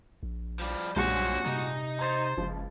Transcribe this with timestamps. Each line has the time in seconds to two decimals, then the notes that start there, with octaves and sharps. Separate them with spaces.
0.23 A#1
0.60 F3 G3
0.96 B1 G2 A#2 G#3 C#4 F#4 C5
1.46 C3 D#4
1.99 C5 A#5 G#6 A6
2.37 F#1 C#2 F3